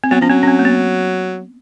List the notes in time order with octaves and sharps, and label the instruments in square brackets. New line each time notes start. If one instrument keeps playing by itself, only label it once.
[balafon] C4
[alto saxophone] F#3 [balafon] B3
[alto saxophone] F3 [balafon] C#4
[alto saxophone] F#3 [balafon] C4
[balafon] C#4
C4
A#3
B3